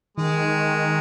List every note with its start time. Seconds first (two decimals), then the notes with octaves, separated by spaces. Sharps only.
0.17 D#3 G#3